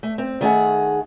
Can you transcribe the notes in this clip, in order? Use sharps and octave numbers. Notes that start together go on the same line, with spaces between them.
A3
C4
D#3 A3 G#4 F#5